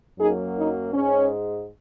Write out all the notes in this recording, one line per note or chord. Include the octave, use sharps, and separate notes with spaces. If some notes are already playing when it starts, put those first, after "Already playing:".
F#2 F#3 A#3 D#4 G#4
D#4
G#2 G#3 C#4